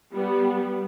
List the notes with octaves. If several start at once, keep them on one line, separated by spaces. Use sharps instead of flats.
G3 B3